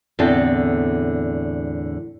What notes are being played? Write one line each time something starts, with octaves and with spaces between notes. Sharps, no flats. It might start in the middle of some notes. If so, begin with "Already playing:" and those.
E2 A2 D3 C4 A4